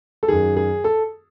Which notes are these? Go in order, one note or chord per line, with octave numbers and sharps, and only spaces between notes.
A4
F#2 D#3 G#4
G#4
A4